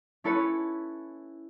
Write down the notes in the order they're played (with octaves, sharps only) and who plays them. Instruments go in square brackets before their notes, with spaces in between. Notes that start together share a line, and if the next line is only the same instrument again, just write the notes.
[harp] C#4 E4 A4 B4 C#5